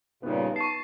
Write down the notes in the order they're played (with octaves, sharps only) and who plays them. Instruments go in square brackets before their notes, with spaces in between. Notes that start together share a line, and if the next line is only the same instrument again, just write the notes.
[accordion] G2 A#2 C#3 [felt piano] B3 D#4
[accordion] A5 [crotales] C#6 C7